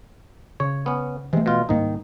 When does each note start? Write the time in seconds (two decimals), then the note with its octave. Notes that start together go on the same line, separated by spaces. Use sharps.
0.60 C#3 C#5
0.86 B3 C#4
1.33 C3 E3 G#3 A3
1.46 B2 F4
1.69 C2 G#2 D#3 A#3 D#4